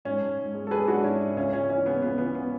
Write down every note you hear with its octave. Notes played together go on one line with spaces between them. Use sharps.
G#2 C#4
G#2
G#2
G#3
A4
G#3 G#4 B4
G#3 D4 F#4
G#2 C#4 E4
G#2
C#2 C#4
C#2 C#4
E3 C#4
C#3 B3
C#2 B3
E3 B3
B3